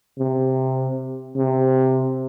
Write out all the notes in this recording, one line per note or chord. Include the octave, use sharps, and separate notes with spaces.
C3
C3